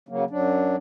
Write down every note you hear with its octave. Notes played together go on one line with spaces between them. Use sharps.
C#3 F#3 A#3
F#2 F#3 D4